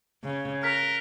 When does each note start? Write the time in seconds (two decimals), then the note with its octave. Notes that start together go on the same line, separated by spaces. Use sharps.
0.23 C#3
0.63 A#4 F6 F#6 B6